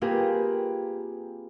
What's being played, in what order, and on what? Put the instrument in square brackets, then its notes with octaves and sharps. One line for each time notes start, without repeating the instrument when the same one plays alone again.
[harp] A#3 C4 F4 G4 G#4 B4